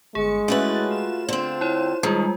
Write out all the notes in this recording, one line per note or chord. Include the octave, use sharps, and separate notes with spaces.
G1 G#3 G#4 C#7
A3 C#4 E4 F#4 B4 A6
F4 E7
D3 C4 C5
E4 C#5
D#3 G3 G#3 F4 G#4